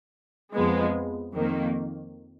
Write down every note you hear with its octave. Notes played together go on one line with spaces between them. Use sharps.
F2 F3 G#3 B3
F2 D#3 A#3